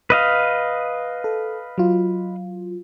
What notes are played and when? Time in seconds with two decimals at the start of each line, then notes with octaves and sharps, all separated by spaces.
0.10 B4 D#5 F5
1.24 A4
1.78 F#3 F4